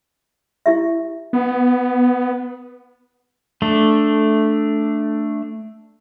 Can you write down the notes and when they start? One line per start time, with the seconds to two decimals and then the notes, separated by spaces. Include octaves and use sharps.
0.66 E4 G4 E5
1.33 B3
3.62 A3 D4